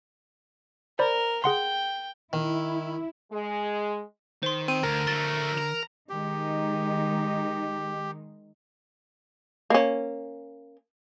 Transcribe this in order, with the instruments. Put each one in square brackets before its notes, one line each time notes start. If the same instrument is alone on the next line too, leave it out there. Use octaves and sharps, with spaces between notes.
[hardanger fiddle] A#4 [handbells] C5 D5 B5
[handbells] G#4 F#5 C6 [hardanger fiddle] G5
[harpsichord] D#3 [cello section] E4
[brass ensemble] G#3
[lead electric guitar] D#3 [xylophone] C5 C6
[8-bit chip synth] C4 [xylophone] D#7
[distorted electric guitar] D2 [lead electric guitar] D3 [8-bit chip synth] A#4
[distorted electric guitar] F#3 A3 [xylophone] A6
[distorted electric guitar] A#5
[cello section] D#3 G#3 D#4 [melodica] G4
[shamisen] A#3 C#4